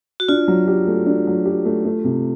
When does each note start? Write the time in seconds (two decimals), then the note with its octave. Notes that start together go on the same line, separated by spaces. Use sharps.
0.20 F#4
0.28 D4 F4
0.48 F#3
0.67 G4
0.87 A3
1.06 D4
1.27 F#3
1.46 G4
1.65 A3
1.85 A3
2.04 C3